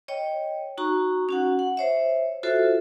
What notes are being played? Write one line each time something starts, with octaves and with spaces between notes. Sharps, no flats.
C#5 D#5 G5
D#4 F#4 A#5 C#6
C#4 F#4 F#5
F#5
C5 C#5 E5
F4 F#4 A4 C5 E5